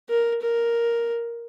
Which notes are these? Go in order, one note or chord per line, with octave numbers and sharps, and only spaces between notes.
A#4
A#4